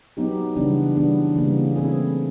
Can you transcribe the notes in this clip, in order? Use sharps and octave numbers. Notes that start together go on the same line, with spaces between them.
F#3 B3 D#4 G4
C#3 E3 G3 B3 D4
E3 G3 B3 D4
C#3 E3 G3 A#3
E3 A3 C4 E4 G#4